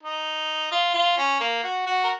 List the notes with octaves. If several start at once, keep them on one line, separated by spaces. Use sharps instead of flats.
D#4
F4
F4
C#4
A#3
F#4
F#4
A#4